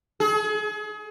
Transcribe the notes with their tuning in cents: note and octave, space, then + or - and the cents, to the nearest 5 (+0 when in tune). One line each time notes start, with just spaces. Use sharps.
G#4 +35